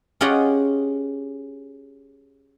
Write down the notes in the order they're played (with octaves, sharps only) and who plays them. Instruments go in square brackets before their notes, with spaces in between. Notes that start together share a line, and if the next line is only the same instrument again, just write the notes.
[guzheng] C#4 F4 G4 G#4 D#5 F#5